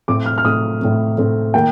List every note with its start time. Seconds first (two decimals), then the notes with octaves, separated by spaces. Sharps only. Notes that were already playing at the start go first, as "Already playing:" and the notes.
0.08 A2 A3 C4 D6
0.26 F6
0.38 F6
0.44 A2 A3 C4 D#6
0.81 A2 A3 C4
1.18 A2 A3 C4
1.54 D#3 A#3 G5